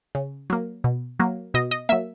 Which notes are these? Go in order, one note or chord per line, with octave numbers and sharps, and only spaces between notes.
C#3
F#3 A#3
B2
F#3 A#3
B2 D#5
D#5
F#3 A#3 E5